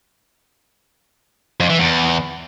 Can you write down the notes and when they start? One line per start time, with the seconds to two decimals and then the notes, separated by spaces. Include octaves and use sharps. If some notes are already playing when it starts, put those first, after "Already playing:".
1.60 F2
1.70 E3
1.80 E2